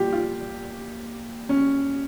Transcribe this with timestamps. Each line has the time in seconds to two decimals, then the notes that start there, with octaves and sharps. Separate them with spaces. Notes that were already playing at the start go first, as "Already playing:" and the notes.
Already playing: A#2 G3 F4 G4
0.13 F4
1.49 C#4